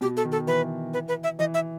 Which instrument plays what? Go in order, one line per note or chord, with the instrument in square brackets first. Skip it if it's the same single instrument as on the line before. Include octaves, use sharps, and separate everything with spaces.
[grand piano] B2 [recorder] G4
[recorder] A4
[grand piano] D#3
[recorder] A4
[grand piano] E3 [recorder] B4
[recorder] B4
B4
E5
[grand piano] E3 [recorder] D#5
[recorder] E5